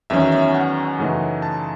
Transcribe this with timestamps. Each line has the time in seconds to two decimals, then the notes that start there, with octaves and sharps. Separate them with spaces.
0.10 E2 D#3 F#3 C#4 E5
0.32 E5
0.55 F#5
0.99 F#2 C#3 E3 A3 D#4
1.42 A5